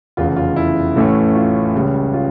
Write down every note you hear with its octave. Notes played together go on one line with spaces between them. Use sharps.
F1 E2 C#3 F4
F4
E4
A1 A2 E3 A3 C#4
F4
C#2 C#3 G3 C#4
F4